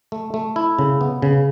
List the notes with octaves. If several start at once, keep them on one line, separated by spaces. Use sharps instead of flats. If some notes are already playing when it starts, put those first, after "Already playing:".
A3
A3
E4
C#3
B3
C#3